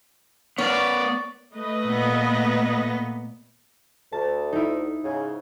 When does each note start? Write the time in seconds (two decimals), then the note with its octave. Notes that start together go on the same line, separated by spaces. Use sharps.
0.58 B3 A#4 B4 C#5 D5
1.55 A3 B4 D#5
1.86 A#2 B3
4.12 D2 A5
4.52 D#4 E4
5.04 G#2 C#3